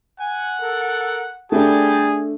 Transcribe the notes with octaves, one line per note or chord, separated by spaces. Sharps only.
F#5 G#5
A4 A#4
G3 A3 D4 G4 G#4 A5